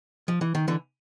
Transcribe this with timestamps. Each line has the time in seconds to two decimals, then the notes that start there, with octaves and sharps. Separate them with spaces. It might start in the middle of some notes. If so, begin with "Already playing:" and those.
0.28 F3
0.41 E3
0.55 D#3
0.68 D3 E3